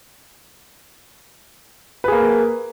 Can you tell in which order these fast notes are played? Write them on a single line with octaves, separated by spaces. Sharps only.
B4 G#4 A#3